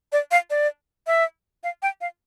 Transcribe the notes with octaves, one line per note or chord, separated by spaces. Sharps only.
D5
F5
D5
E5
F5
G5
F5